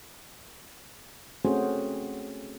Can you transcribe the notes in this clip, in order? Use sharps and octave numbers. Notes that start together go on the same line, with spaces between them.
A3 C4 C#4 F#4 G#4 C5